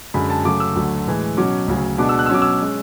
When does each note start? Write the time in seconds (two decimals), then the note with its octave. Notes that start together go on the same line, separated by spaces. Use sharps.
0.14 F#2 D3 G#3 B5
0.30 A5
0.45 C#3 F#3 A3 D6
0.60 E6
0.76 D2 D3 F#3 A3
1.07 A2 E3 G#3
1.37 B2 F#3 C#4 D6
1.68 D2 C#3 F#3
1.98 B2 G#3 B3 D4 D6
2.09 E6
2.19 F#6
2.26 E6
2.29 B2 F#3 C#4 D6
2.42 E6
2.62 G#3 C#4